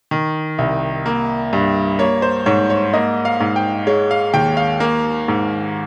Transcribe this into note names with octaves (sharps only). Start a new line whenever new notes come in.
D#3
C2
A#3
G2
A#3 C#5
C5
G#2 C#5
C#5
A#3 D#5
F5
G#2
G5
G#3 C#5
F5
D#2 G5
F5
A#3
G#2